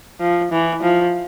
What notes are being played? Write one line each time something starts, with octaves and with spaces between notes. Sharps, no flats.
F3
E3
F3